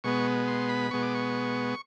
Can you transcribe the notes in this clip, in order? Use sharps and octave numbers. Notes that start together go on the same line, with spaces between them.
B2 G#3 B3 C#6
C6
B5
B2 G#3 B3 C#6
D6
C#6